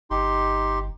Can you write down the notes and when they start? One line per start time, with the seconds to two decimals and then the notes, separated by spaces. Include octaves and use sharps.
0.10 G1 D#4 G4 C6